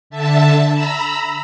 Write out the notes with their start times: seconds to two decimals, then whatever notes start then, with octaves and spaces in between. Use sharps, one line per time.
0.10 D3 E5 A5
0.71 A#5 B5 E6